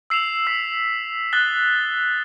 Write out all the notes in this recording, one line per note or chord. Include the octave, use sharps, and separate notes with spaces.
E6 C7 E7 F7
E6 B6
D#6 F#6 A6 G7